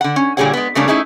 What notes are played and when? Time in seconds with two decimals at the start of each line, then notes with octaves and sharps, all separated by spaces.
0.01 D3 F#5
0.16 C#4
0.37 A#2 D3 G3 G#4 C#5 F#5
0.53 G#3 B3
0.75 C#3 G3 A3 A#3 C#4 D4
0.88 A3 C#4 D#4 E4 G#4